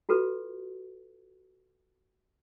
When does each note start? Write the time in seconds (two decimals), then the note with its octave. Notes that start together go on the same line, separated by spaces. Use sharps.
0.09 F4 F#4 A4 B4